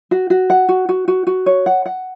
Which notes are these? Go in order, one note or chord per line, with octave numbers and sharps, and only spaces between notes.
F#4
F#4
F#5
F#4
F#4
F#4
F#4
C#5
F#5
F#5